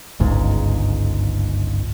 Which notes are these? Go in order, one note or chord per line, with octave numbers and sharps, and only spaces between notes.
G1 C#2 G#2